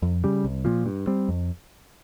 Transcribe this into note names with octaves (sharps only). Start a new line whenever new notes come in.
F2
C#3 G3
C2
A#2 F3
G2
G3 C4
F2